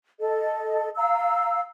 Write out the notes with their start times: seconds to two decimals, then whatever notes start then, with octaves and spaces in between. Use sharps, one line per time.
0.20 A4 D#5
0.96 F5 A#5 E6